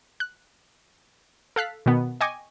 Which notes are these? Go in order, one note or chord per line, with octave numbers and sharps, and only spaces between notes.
F#6
A4 F5 F#6 B6
B2 D#3 B3
D#5 G5 G#5 C#6 D6